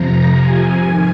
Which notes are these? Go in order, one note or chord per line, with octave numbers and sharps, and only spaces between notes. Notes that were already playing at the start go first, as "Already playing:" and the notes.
Already playing: F2 C3 F3 A#5
G#5
G#2 D#3